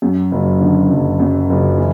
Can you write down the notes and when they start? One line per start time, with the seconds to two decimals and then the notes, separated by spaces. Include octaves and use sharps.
0.02 F#2
0.32 F#1
0.61 D3
0.90 F#1
1.20 F#2
1.49 F#1
1.78 E3